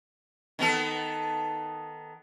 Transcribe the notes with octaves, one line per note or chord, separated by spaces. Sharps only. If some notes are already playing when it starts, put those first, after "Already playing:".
D#3 B3 A4